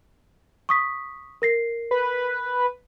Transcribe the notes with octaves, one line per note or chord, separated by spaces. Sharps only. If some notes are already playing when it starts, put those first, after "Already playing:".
C#6 D#6 B6
A#4 A#6 C7
B4